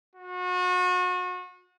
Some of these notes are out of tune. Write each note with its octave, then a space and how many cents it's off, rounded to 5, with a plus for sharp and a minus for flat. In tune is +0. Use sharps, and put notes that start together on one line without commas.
F#4 -35